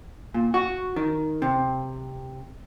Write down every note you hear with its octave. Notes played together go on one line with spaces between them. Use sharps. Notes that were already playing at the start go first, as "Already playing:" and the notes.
A#2
F#4
D#3
C3